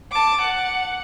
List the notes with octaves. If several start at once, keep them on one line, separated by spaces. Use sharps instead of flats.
A5 D6
F#5